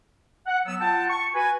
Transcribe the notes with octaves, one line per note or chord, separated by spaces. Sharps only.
F#5
F#3 B3 E6
F4 F#5 G5 A5
C#6
F#4 B4 G#5